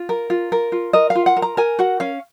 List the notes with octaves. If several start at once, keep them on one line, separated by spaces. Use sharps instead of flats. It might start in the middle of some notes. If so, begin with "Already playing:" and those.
Already playing: F4
A#4
F4
A#4
F4
A#4 D#5
F5
F4
F#5
A#4
A#5
A#4 G#5
F#4 F#5
C#4 F5